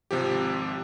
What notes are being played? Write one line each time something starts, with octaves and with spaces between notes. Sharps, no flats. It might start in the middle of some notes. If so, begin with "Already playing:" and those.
G#1 C3 F3 G4